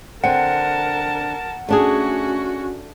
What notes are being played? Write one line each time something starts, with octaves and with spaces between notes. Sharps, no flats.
D3 C4 A#4 F#5 A5
A3 C#4 D4 F#4 G#4